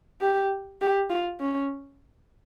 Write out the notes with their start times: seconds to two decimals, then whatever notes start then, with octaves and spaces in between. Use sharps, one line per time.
0.21 G4
0.82 G4
1.10 F4
1.41 C#4